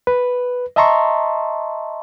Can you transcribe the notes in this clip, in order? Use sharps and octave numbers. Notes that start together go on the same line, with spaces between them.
B4
D#5 E5 A5 A#5 C6 C#6